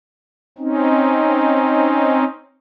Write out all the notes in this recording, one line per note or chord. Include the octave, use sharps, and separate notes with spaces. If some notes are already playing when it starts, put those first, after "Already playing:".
C4 C#4 D#4